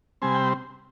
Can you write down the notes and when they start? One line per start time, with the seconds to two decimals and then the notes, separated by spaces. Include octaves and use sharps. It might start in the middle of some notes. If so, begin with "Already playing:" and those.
0.22 C3 G3 C4 G#5
0.34 G5